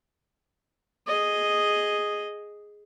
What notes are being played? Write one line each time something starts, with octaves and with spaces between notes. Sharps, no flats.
G#4 D#5